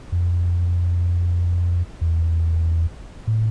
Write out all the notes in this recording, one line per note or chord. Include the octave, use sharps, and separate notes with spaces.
F2
E2
A2